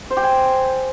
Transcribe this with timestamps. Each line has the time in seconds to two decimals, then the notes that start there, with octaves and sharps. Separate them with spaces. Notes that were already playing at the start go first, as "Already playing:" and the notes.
0.10 C5
0.17 G4
0.23 G#5